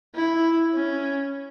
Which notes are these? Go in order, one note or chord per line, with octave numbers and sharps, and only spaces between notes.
E4
C#4